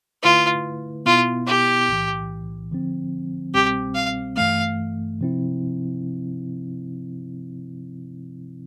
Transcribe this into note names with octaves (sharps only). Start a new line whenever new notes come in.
D3 A3 E4 F4 B4
B2 B3 E4 F4
G4
B1 A2 E3
D3 F3 C4
C2 B2 G3 C4 G4
F5
G2 E3 A3 F5
C3 F3 C4 E4